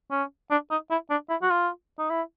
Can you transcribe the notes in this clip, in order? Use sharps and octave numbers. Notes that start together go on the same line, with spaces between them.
C#4
D4
D#4
E4
D4
E4
F#4
F4
D#4
E4